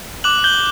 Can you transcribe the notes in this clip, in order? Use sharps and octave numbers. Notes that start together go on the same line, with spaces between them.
D6 F#6 F#7
G6 G7